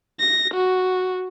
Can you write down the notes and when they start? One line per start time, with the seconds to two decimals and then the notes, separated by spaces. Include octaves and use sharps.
0.20 A#6
0.54 F#4